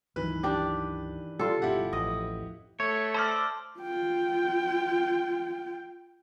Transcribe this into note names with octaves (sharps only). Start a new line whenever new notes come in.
C#2 G2 D#3 E3 F#3 B4
D4 G4 D5
C#3 G3 F4 A4
G1 B2 E4 G4 F#5
A1 F2 D#5
A3 C#5
C5 D5 A5 E6 F6
F4 G5